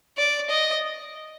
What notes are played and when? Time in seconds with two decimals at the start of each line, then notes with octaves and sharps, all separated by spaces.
0.17 D5
0.50 D#5